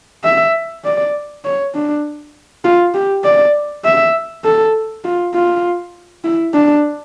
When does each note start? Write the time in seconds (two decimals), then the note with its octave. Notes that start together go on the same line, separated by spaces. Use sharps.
0.24 E5
0.85 D5
1.45 C#5
1.75 D4
2.65 F4
2.94 G4
3.24 D5
3.85 E5
4.44 A4
5.04 F4
5.34 F4
6.24 E4
6.54 D4